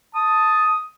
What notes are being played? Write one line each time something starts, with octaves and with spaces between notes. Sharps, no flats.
A5 D#6